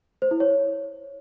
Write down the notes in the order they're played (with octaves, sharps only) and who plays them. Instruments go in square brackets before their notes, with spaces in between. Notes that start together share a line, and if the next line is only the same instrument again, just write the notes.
[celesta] C5
E4
C#5